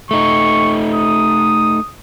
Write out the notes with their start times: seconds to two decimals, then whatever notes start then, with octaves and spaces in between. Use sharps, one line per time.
0.11 A3 D#4 C#6
0.94 D#6